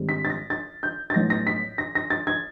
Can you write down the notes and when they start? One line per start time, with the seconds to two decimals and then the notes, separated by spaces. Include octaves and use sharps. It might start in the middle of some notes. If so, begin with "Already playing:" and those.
Already playing: G#2 D#3 G3 C4
0.09 B6
0.25 A6
0.30 A#6
0.50 A6
0.83 G6
1.10 A6
1.14 A2 F#3 B3 D#4 A#6
1.30 A#6
1.47 B6
1.78 A#6
1.95 A#6
2.10 A6
2.27 G#6